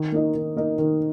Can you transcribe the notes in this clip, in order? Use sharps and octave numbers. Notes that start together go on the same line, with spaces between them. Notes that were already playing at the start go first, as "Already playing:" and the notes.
Already playing: D#3
A#3 D#4 A#4 D#5
D#3
A#3 D#4 A#4 D#5
D#3